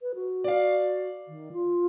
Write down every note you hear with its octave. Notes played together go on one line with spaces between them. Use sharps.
B4
F#4
D5 F5
D#3
F4